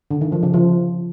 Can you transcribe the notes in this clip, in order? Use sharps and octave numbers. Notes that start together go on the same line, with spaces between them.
D3
D#3
F3
C#3
F3